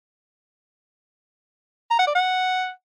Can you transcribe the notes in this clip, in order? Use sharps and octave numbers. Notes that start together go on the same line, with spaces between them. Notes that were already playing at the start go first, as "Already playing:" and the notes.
A#5
F#5
D5
F#5